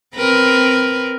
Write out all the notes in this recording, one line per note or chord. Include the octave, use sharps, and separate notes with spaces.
C4 A#4 B4